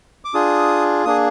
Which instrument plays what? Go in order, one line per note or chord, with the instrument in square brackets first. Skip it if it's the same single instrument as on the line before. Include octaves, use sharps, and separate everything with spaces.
[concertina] D6
D4 F4 G#4 D#6
A#3 D4 G#4 D#6